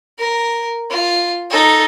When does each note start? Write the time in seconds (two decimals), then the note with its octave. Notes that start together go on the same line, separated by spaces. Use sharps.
0.18 A#4
0.90 F4
1.50 D#4 A4